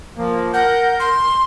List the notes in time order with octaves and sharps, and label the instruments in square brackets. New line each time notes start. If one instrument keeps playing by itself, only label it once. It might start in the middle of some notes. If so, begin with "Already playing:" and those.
[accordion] F3 A#3
[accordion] A#4 G6 [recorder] F#5
[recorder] C6